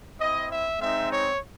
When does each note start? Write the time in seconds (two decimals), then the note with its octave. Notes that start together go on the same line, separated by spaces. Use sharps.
0.19 C4 E4 D#5
0.49 E5
0.80 G#3 C4 D#4 E5
1.10 C#5